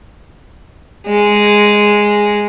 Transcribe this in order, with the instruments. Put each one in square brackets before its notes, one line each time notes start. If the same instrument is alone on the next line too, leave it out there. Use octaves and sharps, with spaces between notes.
[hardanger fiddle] G#3